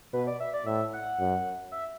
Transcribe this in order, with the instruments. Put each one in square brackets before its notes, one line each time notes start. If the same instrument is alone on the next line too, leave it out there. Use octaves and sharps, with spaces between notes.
[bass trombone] B2 [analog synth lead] B4
[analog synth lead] D5
E5
D5
[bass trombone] A2 [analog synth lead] E5
[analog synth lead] F#5
[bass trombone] F#2
[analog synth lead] E5